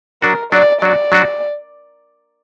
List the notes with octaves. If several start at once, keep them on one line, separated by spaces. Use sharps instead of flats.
F#3 D4 F#4 A#4
F#3 D4 F#4 D5
F#3 D4 F#4 D5
F#3 D4 F#4